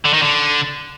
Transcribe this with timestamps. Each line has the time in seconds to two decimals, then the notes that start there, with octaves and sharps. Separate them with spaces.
0.05 D3
0.14 D#3
0.22 D3